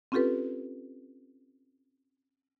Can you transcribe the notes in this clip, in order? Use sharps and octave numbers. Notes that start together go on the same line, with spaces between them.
C4 C#4 F4 G4 A4 B4